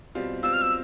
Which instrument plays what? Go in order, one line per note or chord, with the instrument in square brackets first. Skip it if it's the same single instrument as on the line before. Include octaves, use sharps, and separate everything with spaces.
[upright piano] B2 G3 C4 F4
[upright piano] B2 G3 C4 F4 [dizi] E6
[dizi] F6
E6